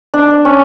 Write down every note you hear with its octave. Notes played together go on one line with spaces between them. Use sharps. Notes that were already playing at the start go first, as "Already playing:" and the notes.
D4
C#4